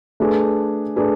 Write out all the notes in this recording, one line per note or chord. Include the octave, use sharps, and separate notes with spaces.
A3 D4 G#4 B4
A3 D4 G#4 B4